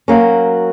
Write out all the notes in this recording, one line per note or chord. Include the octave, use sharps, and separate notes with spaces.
F#3 A#3 C#4